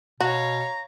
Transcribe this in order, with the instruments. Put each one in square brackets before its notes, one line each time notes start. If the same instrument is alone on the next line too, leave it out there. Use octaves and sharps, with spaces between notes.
[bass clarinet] B2 [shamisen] F#4 [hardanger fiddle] C#5 F5 [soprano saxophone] A#5